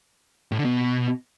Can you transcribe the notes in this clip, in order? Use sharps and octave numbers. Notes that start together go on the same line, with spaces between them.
A2
D3
B2